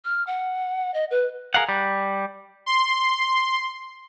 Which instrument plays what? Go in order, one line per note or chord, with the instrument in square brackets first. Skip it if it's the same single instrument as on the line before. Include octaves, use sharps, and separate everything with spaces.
[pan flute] F6
F#5
D#5
B4
[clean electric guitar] G#4 A#4 F5 F#5
G3
[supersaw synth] C6